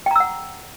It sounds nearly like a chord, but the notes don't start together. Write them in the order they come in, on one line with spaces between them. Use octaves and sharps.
G5 A#5 E6 F#5